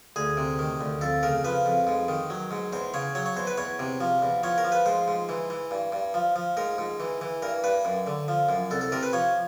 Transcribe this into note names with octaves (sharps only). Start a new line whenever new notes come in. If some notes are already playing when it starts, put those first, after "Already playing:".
D2 G#4
C3
D#3
D2
F2 A4
C#3 A#4
F3 B4
F2
G#2
D#3
F#3
G#2
E2 C5
C#3 C#5
F#3 C#5
C#5
E2 C5
B4
E2 C#5
C3
F3
E2
F3 C#5
A#4
F3
B4
G#2 C5
G#2
E3
E3
G2
G2
F3
F3
G#2 A#4
G#2
E3
E3
G2 A#4
G2 B4
F#2
D3
F3
F#2
C2 A4
A4
C3 A#4
B4
F3 C#5